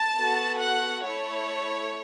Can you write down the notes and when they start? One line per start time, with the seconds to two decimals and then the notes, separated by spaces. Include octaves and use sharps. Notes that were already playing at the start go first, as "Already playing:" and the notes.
Already playing: A5
0.18 B3 F#4 A4
0.62 F#5
1.06 A3 E4 A4 C#5